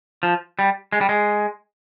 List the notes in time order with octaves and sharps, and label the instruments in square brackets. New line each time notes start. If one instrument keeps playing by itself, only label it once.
[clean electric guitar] F3
G3
G#3
G3
G#3